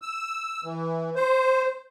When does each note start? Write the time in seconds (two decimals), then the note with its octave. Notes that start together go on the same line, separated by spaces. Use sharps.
0.02 E6
0.64 E3
1.16 C5